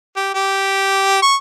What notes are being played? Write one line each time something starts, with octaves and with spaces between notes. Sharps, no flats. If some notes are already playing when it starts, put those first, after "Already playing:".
G4
G4
C#6